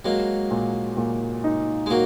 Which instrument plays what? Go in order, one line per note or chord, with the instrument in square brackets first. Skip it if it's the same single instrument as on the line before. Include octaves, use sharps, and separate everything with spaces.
[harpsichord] F#3 A#3 [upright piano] G#3
[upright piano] A#2
A#2
D#4
[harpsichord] G#3
[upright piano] A#2 [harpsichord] F#3 A#3